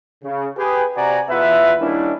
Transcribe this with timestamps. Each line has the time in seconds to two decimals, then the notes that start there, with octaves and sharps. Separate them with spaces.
0.24 C#3
0.57 G4 G#4 B4
0.97 C3 F#4 D5 G#5 A#5
1.29 E2 B2 B3 F4 B4 E5
1.80 D#3 G3 A#3 C#4 D4 E4